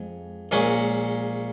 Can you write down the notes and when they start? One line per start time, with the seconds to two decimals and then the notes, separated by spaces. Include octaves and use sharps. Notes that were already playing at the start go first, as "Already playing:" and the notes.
Already playing: F2 G#3
0.51 A#1 A#2 G#3 C#4